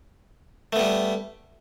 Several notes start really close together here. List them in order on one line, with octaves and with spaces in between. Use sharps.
A3 B3 G3